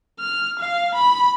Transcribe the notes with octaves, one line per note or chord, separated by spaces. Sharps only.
F6
F5
B5